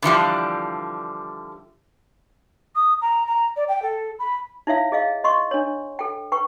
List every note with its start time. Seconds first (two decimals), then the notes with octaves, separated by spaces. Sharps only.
0.02 D3 E3 F3 G3
2.75 D#6
3.01 A#5
3.26 A#5
3.56 D5
3.68 G5
3.82 A4
4.19 B5
4.67 D#4 E4 C#5 E5 F5
4.92 G#4 D#5 F5
5.24 D#5 C6 C#6
5.51 D4 C#5
5.99 A4 G5
6.32 B4 G5 C#6